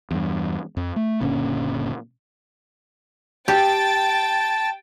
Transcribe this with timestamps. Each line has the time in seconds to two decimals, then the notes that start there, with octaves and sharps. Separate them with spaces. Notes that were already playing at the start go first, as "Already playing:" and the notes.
0.11 E2 G2
0.77 F2
0.96 A3
1.21 F#1 A#2 D3 C#4
3.48 G4 G5 A5 A6